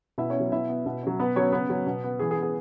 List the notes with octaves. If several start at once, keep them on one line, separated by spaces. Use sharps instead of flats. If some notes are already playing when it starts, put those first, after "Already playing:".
B2 E4 E5
C#4 C#5
F#3 B3
B2 E4 E5
B3
B2
F#3 C#4
B2 B3 B4
F#3 B3 C#4 C#5
C#3 B3 B4
F#3 C#4
B2
B3
E3 G#4
G#4
B3
G#4